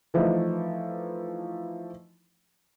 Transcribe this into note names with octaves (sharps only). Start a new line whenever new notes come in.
E3 F3 A3 D#4